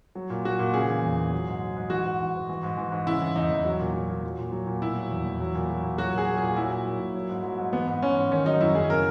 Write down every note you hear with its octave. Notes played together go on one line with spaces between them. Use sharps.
F#3
A#2
F#3 F#4
A#2
C#3 G#4
E3
E2
E2
F#3
G#2
F#3
G#2
E3 F#4
G#2
E3
G#2
E3
G#2
E3
G#2
C#3 E4
E3
E2 D#4
E2
F#3
A#2
F#3
A#2
F#3
A#2
F#3
A#2
B2 E4
F#3
E2
E2
F#3
A#2
F#3
A#2
F#3 F#4
A#2
G#4
F#3
A#2 G#4
F#3 E4
A#2
F#3
A#2
F#3
G#2
F#3
G#2
E3 B3
G#2
E3 C#4
G#2
D#3 C#4
F#3 D#4
F#2 E4
F#2 G#4
C#3 A#4